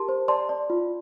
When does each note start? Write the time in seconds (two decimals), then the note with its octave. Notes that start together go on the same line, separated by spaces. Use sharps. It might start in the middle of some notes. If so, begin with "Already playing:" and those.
Already playing: G4 A#4 A5 C6
0.09 C5
0.28 D5 A5 C6
0.49 D5
0.70 F4